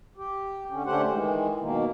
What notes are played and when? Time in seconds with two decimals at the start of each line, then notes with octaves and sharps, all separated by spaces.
0.17 G4
0.70 D3 C#4
0.86 D3 A3 C#4 G4 C5 F#5
1.10 D#3 E3 G#3
1.61 B2 D#3 A#3